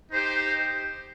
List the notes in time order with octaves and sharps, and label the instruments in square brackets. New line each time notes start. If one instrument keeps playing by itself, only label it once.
[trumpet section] D#4 G4 C5